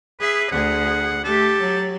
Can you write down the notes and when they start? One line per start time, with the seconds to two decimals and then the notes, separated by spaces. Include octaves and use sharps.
0.20 G#4 B4 E5
0.52 D2 G#4 F#5
1.24 A3 G4 A4
1.61 F#3